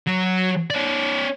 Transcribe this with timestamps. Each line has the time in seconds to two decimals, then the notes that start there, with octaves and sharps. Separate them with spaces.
0.07 F#3
0.70 C#4 D5